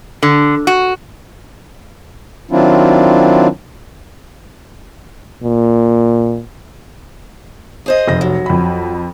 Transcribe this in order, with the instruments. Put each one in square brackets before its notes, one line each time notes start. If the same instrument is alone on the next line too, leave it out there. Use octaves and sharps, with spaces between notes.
[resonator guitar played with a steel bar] D3
F#4
[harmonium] D#3 F#3 C4 D4 E4 F4
[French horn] A#2
[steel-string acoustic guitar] G#4 C5 D#5
[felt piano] F1 A#6
[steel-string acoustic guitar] F#3
[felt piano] F2 B5